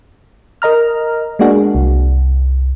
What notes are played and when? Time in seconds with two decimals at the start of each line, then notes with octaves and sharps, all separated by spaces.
0.62 A#4 D#5 A#5 F6
1.39 G#3 A#3 D4 F#4 G#4
1.75 C2